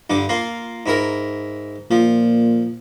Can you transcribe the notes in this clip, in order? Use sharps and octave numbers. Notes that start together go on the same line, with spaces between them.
G2 D3 D6
A#3 F4
G#2 E4 A#4
A#2 F3